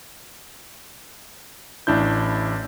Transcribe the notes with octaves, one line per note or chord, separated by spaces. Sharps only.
A1 D4 E4 G6